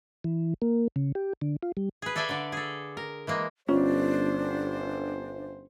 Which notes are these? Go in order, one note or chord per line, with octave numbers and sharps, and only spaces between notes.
E3
A#3
C#3
G4
D3
F4
G3
G#4 B4
A4 D5 E5 F5 G#5
D3 D5
G#4 A4
A#4
E3 G#3 A#3
G1 C#4 D4 F4 C5